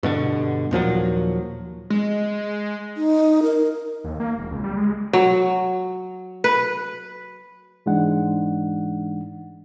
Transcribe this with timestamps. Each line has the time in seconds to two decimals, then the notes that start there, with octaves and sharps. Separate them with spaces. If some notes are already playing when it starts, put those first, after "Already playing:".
0.03 G2 B2 D3
0.71 D#2 A#2 F3 F#3
1.90 G#3
2.97 D#4
3.43 A#4
4.04 D#2
4.20 A#3
4.38 E1
4.51 C#2
4.64 G3
4.77 G#3
5.13 F#3
6.44 B4
7.86 G#2 E3 G#3 D4 D#4 F#5